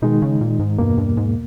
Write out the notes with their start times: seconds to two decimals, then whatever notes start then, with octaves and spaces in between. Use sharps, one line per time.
0.02 B2 D#3 G#3 D#4
0.22 C#3
0.41 A#2
0.59 G#2
0.78 E2 G2 B2 A#3
0.98 G2
1.17 G#2